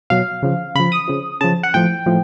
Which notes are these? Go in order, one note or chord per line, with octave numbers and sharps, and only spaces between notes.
B2 F#3 F5
C#3 F3
C#3 F3 B5
D#6
C#3 F3
C#3 F3 A5
F#5
A2 F3 G5
A2 F3